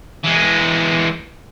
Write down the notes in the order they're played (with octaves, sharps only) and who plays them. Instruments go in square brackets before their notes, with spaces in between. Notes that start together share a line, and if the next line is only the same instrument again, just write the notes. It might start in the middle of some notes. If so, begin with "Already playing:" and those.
[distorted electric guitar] E3 G#3